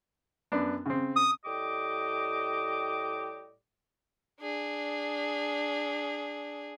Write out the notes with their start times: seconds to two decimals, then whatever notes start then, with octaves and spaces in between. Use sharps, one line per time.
0.52 F#2 B3 D4
0.86 C#3 C4
1.16 D#6
1.45 A2 G3 G4 D#5 D6
4.40 D4 G#4